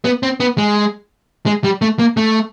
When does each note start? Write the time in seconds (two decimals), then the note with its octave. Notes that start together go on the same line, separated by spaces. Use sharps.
0.05 B3
0.23 C4
0.40 B3
0.58 G#3
1.46 G#3
1.64 G3
1.82 A3
1.99 A#3
2.17 A3